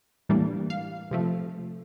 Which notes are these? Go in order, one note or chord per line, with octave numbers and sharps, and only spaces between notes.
A2 E3 G3 A#3 D4
F5
C3 F3 A3